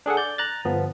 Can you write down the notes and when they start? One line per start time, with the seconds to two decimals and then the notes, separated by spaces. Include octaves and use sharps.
0.06 D4 G#4 A4 F#5
0.17 D5 G6
0.38 A#5 F#6 A6
0.65 G1 F3 B3